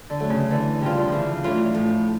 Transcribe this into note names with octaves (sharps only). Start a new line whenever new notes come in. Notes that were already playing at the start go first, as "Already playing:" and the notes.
D3
F#3 A3
C#3
D3 E3
C#3 G3 C4 F4
D3
C#3 E3 F3
E3 F#3 A3 C#4 F4
A2 F3